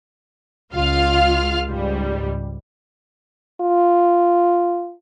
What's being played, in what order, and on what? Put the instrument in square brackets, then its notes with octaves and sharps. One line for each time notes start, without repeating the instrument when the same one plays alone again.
[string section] C#2 F4 F5 F6
C#2 G#2 G3
[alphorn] F4